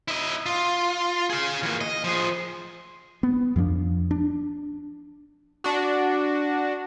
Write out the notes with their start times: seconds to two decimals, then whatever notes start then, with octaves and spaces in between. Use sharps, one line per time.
0.08 E4 D#5
0.46 F4
1.30 G#4 F5
1.63 E3 A#3
1.81 D#5
2.04 F3 G#4
3.23 B3
3.56 F2 F3 G#3 D4
4.11 D4
5.64 D4 F#4